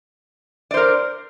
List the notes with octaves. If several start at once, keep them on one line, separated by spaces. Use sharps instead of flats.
A#4 C5 D5